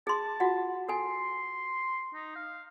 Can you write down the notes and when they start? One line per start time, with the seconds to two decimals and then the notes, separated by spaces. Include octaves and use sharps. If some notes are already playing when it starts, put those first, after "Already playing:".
0.07 G#4 A5 C6
0.40 F4 F#4 F#5
0.89 A4 G#5 C6
2.14 D#4
2.36 F5